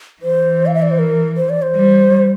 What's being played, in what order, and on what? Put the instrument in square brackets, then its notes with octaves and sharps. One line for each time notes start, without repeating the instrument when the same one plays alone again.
[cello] E3 [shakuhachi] C5
[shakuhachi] F5
E5
D5
C5
A#4
C5
D5
C5
[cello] G3